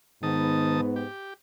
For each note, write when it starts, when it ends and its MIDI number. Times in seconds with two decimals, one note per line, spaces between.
0.23 1.04 44
0.23 0.81 51
0.23 1.04 59
0.23 0.81 81
0.23 0.81 87
0.96 1.34 67